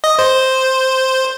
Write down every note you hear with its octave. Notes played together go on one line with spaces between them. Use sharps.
D#5
C5